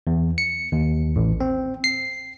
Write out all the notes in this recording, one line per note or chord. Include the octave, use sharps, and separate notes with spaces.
E2
C#7
D#2
A1
C4
C7